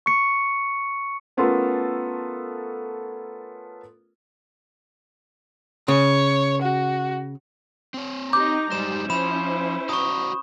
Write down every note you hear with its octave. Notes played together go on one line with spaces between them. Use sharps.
C#6 C#7
A3 B3 C#4 F4 A4 A#4
C#3 C#5
F#4
C4 C#5
D#4 G4 A#5 D6 G6
F#2 G3 G#3 D#4 C5 E7
F3 C#4 E4 C5 B5 E7
F#4 D5 A#5 C#6 D#6